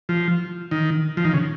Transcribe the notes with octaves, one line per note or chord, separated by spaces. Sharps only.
F3
D#3
F3
D#3
C#3